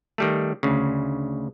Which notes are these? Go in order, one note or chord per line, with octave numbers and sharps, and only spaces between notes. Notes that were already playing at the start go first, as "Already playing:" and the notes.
D#3 G3 A3
D2 C#3